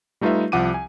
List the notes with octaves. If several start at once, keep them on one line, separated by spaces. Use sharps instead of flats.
G3 A3 D#4 F4 B4 E5
C2 F3 F#5 D6 D#7
G#5